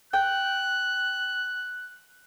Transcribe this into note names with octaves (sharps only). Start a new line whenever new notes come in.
G5 F#6